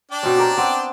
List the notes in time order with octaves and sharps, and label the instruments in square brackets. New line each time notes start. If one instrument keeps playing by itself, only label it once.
[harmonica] D4 D5 G5
[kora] B2 C4 C#4
G4 A#4
B3 C4